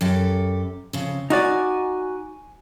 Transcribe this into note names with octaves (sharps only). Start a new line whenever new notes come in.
F#2 G4 A4
F2 C#3
D#4 F#4 D5 G#5